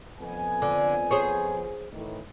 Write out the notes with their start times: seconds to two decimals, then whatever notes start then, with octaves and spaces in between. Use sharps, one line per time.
0.19 F2 B3 G#5
0.62 D3
1.11 G#4 C5 C#5
1.92 A2 D#3 E3